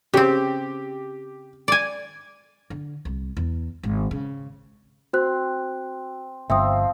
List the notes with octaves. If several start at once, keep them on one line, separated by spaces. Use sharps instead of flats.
C#3 C4 G4
D5 G#5
D3
C2
E2
G#1
C#3
C4 F#4 C5 F#6
G1 F3 C4 E5 G5 D#6